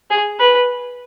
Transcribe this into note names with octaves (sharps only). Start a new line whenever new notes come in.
G#4
B4